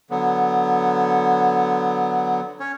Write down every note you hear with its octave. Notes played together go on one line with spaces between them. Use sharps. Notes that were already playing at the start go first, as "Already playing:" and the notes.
D3 F#3 B3
C#4 C#5